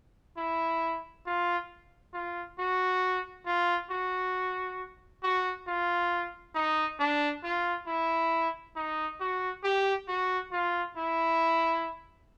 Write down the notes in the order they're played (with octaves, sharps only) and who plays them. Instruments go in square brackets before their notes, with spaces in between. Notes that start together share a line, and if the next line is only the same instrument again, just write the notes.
[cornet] E4
F4
F4
F#4
F4
F#4
F#4
F4
D#4
D4
F4
E4
D#4
F#4
G4
F#4
F4
E4